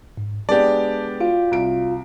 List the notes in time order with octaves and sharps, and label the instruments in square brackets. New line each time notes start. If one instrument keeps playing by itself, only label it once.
[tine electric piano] G#2
[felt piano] G#3 B3 D4 [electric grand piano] G4 D5 [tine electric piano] A5
[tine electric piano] F4 F#4 F5
[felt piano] C2 D7